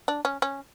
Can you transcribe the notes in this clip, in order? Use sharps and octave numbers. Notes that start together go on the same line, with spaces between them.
D4
C#4
C#4